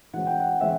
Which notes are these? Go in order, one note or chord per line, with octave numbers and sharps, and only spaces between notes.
E3 G#3 C#4 F#5
G5
F#5
E3 G#3 C#4 E5